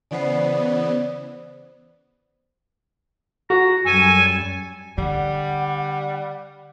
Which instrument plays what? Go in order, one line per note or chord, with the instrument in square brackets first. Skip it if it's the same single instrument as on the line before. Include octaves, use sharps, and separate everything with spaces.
[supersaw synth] C#3 E3 B3 [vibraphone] C5 D5
[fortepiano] F#4 [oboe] A#5
[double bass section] F#2 G3 [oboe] A4 [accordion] G#5
[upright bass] D3 [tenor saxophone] G3 [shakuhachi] F#5